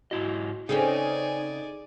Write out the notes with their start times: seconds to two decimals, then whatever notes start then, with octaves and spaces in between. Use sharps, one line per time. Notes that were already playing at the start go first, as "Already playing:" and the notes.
0.11 G#2 E4 F#4 D#5
0.69 C#3 C4 C#4 D#4 G#4 A4 D5 G#5